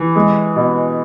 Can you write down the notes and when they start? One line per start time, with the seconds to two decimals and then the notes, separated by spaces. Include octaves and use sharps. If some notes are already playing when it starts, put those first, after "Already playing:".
Already playing: E3
0.16 G#3
0.56 B2